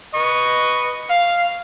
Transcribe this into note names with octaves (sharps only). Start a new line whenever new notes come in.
B4 D#5 C#6
F5